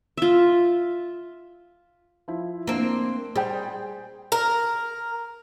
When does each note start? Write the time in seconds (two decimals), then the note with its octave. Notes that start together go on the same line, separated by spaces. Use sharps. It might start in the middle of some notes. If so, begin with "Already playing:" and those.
0.17 F4 E5
2.28 F3 E4
2.67 A#3 C4 D4
3.36 G3 G#4 C5 G5
4.32 A#4